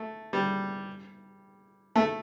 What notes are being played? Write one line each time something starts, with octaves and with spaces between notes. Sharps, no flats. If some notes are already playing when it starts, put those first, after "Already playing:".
Already playing: A3
G3
A3